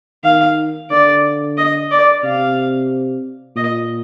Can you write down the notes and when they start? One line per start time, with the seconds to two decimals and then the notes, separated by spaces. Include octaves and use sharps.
0.24 D#3 F5
0.90 D3 D5
1.58 D#5
1.91 D5
2.24 C3 F5
3.57 A#2 D#5